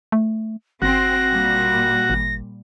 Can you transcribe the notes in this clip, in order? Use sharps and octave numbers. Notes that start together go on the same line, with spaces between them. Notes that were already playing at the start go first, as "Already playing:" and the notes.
A3
G1 C4 F#4 A#6
A#2 G3
G#1